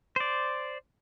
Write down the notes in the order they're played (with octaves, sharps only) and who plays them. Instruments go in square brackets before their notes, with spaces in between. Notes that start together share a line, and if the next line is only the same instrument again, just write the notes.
[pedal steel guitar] C5 D5